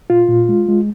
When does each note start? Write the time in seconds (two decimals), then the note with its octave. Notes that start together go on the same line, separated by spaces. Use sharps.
0.10 A#2 F4
0.29 A#2
0.49 G#3
0.68 G#3